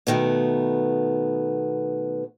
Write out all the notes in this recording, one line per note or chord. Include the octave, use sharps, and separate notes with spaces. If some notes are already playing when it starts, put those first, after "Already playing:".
B2 D#3 A3 B3